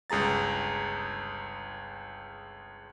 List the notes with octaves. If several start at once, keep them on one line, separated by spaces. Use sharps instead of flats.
G1 C#2 G#4 A#5 A6